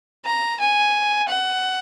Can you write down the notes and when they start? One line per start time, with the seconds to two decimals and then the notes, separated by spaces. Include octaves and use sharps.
0.25 A#5
0.60 G#5
1.28 F#5